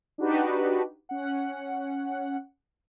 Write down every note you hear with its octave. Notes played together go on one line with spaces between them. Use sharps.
D4 D#4 F#4 G4 B4
C#4 F#5